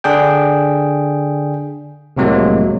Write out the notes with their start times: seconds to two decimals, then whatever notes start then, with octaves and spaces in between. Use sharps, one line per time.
0.04 D3 D4 G#4 G5
2.17 C2 A2 C3 F#3 G#3 A#3